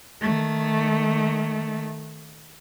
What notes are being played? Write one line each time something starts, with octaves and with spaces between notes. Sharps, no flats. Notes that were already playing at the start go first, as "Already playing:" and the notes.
D#3 A3